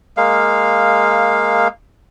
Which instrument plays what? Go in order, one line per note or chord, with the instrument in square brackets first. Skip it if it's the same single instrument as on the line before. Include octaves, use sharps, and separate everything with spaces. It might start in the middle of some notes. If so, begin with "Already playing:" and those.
[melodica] G#3 A#3 F5